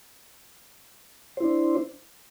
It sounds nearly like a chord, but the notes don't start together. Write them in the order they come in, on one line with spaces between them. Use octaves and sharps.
C5 E4 D4